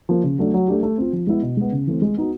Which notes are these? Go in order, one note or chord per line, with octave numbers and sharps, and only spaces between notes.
F3 A#3
C#3
F#3 A3 D4
F#3
A3 D4 G4
A3
C4 F4
F3
G#3 B3 E4
B2
G#3 B3
C#3
E3 A3 C4
G#3
B3 D#4 F#4